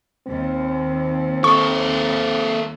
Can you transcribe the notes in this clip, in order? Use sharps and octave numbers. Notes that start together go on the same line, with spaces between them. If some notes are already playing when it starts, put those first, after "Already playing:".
D#2 C4
A#3 A4 C#6